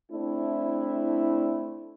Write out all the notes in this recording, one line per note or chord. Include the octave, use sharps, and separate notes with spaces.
A3 C4 D4 E4